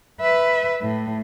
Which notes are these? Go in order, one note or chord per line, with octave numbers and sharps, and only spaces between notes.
B4 E5
A2